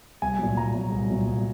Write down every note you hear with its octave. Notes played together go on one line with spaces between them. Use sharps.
C2 G#5
A#2 F#3
C2 A#5
A#2 F#3
C2
A#2 F#3
C2